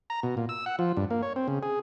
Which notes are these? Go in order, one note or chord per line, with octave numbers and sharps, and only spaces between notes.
A#5
B2
A#2
E6
F#5
F3
G2
A#3
C#5
C4
C#3
G#4